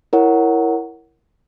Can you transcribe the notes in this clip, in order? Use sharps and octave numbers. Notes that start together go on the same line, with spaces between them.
E4 A#4 C#5 F#5